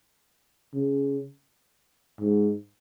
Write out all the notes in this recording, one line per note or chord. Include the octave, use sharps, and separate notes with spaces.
C#3
G#2